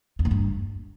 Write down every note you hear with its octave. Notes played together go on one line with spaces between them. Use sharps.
E2
A#2
G2